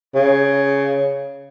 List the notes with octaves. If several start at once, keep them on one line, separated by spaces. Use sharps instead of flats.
C#3